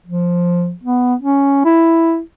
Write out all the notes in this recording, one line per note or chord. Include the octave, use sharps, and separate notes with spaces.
F3
B3
C#4
E4